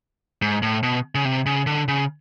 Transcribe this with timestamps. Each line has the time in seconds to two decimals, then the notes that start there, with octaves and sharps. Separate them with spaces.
0.42 G#2
0.63 A2
0.83 B2
1.15 C#3
1.25 C3
1.46 C#3
1.67 D3
1.88 C#3